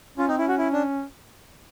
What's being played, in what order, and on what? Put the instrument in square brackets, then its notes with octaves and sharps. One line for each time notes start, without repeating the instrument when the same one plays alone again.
[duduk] C#4 [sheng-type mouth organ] F4
[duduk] C4 [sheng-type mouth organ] D#4
[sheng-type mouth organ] E4
[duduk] C#4
[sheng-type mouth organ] F#4
E4
D4